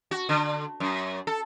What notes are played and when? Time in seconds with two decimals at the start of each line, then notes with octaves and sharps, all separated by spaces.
0.11 F#4
0.29 D3
0.80 F#2
1.27 A4